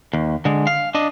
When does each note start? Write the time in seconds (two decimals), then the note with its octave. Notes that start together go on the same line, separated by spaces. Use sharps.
0.13 D#2
0.45 D3 G#3
0.67 F5
0.95 D4 D#5